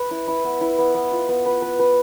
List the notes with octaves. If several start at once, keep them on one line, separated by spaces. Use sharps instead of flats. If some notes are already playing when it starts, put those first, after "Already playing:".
Already playing: B4
E4
E4
B3
E4
B3
B3
F4
B3
B4
B4
B4